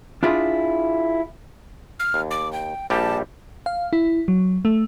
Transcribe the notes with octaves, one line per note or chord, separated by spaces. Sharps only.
D4 E4 F4 G#4
F6
D#2
D6
G5
A#1 G3 G4 A5
F5
E4
F#3
A3